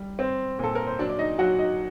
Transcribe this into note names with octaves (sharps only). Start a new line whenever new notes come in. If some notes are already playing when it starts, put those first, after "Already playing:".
Already playing: G3
C4 C5
A#2 A4
A#4
C5
F#3 D4 D5
D5
D#4 D#5
F#3 F#4 F#5
D#4 D#5